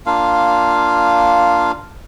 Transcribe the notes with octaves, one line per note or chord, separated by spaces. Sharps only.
A#3 D4 F4 F5